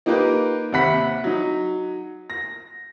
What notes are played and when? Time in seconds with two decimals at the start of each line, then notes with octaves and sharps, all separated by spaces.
0.06 A#3 D#4 F4 G4 A#4 B4
0.72 D#2 C3 E5 F#5 B5 B6
1.24 F#3 D#4
2.30 A#6